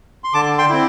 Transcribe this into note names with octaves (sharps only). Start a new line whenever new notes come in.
C6
D3 A5 D6
G5 C6
C4 E4